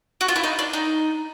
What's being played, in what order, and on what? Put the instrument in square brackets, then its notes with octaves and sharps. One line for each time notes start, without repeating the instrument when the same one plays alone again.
[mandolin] F#4
F4
E4
D#4
D4
D#4